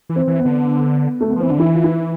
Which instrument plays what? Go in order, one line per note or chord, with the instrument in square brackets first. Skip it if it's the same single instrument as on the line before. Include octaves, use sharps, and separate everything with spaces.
[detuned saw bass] E3
[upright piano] C4
[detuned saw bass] E3
[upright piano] B3
[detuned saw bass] D3
[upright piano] A3
B3
[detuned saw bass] F3
[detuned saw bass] E3 [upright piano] C4
[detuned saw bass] D3 [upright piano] D4
[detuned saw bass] E3 [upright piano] E4
[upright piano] F4
E4